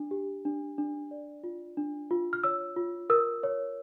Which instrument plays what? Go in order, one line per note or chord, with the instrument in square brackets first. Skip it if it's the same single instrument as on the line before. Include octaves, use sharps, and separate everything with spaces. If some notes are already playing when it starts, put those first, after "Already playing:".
Already playing: [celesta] D4
G4
D4
D4
D5
F4
D4
F4
F6
C#5 E6
F4
A#4 E6
C#5